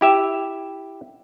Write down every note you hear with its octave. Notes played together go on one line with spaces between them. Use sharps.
E4 G4 E5